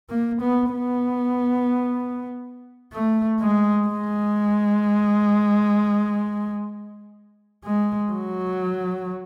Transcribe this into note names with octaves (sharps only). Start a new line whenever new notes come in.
A#3
B3
B3
A3
G#3
G#3
G#3
F#3